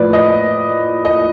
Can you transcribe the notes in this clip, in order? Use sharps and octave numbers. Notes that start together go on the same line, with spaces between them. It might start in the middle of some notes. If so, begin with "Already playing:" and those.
Already playing: A2 F3 B4 D5
D#5
D#5